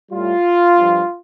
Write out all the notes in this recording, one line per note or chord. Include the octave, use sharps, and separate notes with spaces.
A2 G3 F4
G2 F3